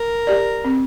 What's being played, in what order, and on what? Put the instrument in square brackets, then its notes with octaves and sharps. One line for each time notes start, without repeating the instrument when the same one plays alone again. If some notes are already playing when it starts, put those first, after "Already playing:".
Already playing: [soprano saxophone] A#4
[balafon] G4 D5
C4